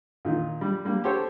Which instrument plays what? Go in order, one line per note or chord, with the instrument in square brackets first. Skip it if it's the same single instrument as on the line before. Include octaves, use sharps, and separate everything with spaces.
[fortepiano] A#2 D#3
G3
G3 A#3
G4 A4 C5 C#5